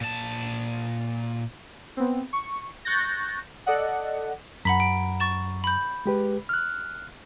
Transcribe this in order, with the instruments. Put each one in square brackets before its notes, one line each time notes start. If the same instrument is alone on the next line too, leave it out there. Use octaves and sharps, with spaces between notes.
[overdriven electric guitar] A#2 A5
[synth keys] B3 C4
C#6
C#6 F#6 G6 A6 A#6
A4 D5 D#5 F#5
[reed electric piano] F#2 F#3 A#5 [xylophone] F#5 B5 B6
[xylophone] D7
C#6 A6 E7
B5 G6
[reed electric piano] G#3 G4 B4
F6 F#6